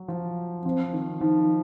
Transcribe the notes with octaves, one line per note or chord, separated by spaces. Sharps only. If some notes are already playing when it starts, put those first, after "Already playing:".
Already playing: F#3
F3
F3 C4
D#3
F3 D#4